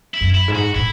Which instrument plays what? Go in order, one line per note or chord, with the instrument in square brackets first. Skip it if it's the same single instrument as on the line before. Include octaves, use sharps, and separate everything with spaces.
[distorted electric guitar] E4
[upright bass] F#2
[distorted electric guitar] E4
[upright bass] G#2
[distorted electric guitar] F#4
[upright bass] A2 [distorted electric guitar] E4